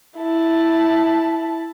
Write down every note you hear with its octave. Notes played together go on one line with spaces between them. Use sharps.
E4 A5